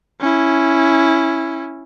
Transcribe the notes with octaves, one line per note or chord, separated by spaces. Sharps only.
C#4 E4